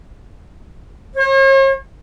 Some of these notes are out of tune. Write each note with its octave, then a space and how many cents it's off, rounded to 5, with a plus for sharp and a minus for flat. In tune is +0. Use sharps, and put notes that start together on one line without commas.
C#5 -45